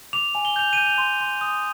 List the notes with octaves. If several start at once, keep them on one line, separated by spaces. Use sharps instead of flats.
D6 F7
G#5
G7
G6 F7
G6 D#7
F7
C6
C6
D#6